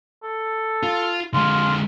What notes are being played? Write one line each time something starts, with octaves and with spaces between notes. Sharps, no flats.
A4
F4
D3 G#3 F4